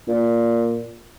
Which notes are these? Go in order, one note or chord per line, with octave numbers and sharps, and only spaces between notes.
A#2